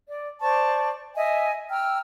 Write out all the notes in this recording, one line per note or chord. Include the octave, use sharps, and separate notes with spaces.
D5
C5 D5 A5 C#6
D#5 E5 G#5
G5 A#5 E6 F6